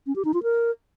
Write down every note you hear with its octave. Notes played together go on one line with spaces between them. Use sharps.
C#4
G4
D#4
F4
A#4